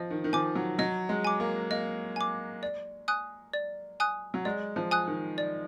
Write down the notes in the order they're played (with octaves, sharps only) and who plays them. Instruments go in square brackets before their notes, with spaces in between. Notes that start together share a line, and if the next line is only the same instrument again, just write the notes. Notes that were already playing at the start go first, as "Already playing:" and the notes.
Already playing: [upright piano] F3 [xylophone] D#5
[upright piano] D#3
D#3
[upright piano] F3 [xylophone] G#5 D6
[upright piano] F#3
[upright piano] F#3 [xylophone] D#5
[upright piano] G#3
[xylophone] G#5 D6
[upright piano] A#3
[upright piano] A#3 [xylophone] D#5
[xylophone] G#5 D6
D5
G#5 D#6 F#6
D5
G#5 D#6 F#6
[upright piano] F#3
[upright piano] G#3 [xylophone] D5
[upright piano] F3
[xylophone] G#5 D#6 F#6
[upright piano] D#3
[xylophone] D5